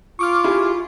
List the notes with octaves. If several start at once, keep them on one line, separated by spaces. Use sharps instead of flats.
F4 C#6 D6 F6
E4 G4 G#4